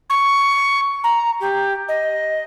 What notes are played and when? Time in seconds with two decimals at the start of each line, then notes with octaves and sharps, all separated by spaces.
0.10 C#6
1.04 A#5
1.40 G4
1.88 D#5